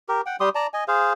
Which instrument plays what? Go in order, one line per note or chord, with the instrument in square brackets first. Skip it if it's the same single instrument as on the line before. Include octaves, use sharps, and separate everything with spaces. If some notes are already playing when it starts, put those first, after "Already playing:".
[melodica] G4 A#4
F#5 G5
G3 G4 C6 D#6
D5 A5 A#5
D#5 G#5
G#4 C5 F5